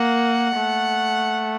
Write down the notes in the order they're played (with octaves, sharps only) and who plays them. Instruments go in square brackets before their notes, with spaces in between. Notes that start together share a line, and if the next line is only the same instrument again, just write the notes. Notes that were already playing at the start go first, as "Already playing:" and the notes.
Already playing: [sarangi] A#3 [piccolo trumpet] F#5
[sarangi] A3